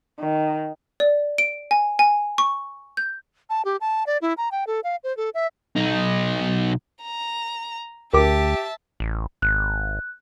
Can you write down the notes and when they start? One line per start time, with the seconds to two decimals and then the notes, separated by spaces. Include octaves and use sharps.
0.19 D#3
1.00 D5
1.38 D7
1.71 G#5
1.99 G#5
2.38 C#6
2.97 G6
3.50 A5
3.65 G4
3.81 A5
4.07 D5
4.22 E4
4.38 A#5
4.52 G5
4.67 A4
4.84 F5
5.04 C5
5.17 A4
5.34 E5
5.76 B1 D#4
7.03 A#5
8.14 D2 G4 A#4 E5 A5 D6
9.00 A1
9.42 G#1 F#6